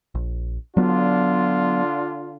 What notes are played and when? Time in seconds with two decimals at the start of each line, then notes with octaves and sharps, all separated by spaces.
0.15 A#1
0.77 D3 F#3 B3 D4 F4